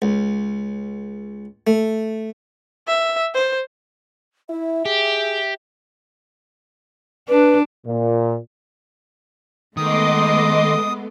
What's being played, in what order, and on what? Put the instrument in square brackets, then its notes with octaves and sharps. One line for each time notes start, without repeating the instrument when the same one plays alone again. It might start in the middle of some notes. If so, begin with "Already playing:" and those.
[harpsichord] C#2
A3
[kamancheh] E5
C5
[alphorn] E4 [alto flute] E5
[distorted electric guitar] G4 [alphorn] G#4
[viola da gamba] D4 [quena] B4
[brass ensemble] A#2
[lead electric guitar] D#3 [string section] G#3 A3 B3 [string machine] D#5 C6 D6 [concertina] D#6